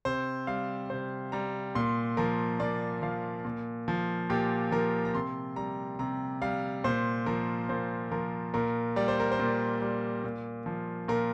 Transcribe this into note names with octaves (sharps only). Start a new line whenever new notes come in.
C3 C5
G3 F5
C3 C5
G3 A#5
A#2 C6
F3 A#4
A#2 D5
F3 F5
A#2
F3
A#2 G4
F3 A#4
A#5
C3 C6
G3 A#5
C3 A#5
G3 F5
A#2 C5
F3 A#4
A#2 C5
F3 A#4
A#2 A#4
G3 D5
C5
A#4
C5
A#2
G3
A#2
F3
A#2 A#4